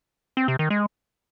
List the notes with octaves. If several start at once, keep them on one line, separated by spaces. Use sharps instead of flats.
C4
C3
D#3
G#3